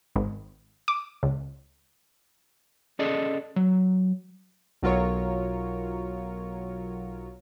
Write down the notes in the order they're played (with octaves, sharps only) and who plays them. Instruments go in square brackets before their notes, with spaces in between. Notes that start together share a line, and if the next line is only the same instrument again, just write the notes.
[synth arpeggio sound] G#1
D6
C#2
[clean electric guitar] C#4 G#4 A4 D5 D#5
F#3
[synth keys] B1 F#3 F4 A#4 C#5